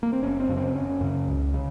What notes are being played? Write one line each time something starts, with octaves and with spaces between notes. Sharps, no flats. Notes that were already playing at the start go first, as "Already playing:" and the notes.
A#3
C4
F#1 C#4
C4
F#2 C#3
C4
F#1 C#4
F#2 C#3
C#2
C#3